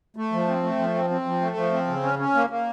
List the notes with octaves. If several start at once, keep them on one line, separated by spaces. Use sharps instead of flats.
A3
F3
C4
A3
F3
C4
C4
F3
A3
F3
C4
C#3
C#4
C#4
A#3
A#3